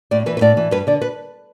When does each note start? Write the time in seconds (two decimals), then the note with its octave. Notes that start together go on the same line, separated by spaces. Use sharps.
0.11 A2 D5
0.26 E3 B4
0.37 B4
0.41 A2 D5
0.57 E3
0.71 G2 B4
0.87 D3 D5
1.02 B4